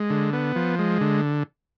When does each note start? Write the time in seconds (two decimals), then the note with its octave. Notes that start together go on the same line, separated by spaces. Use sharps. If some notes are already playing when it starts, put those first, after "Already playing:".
Already playing: G#3
0.10 D3
0.33 B3
0.56 F3
0.79 G#3
1.01 D3